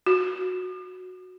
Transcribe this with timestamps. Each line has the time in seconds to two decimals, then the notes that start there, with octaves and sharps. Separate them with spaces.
0.07 F#4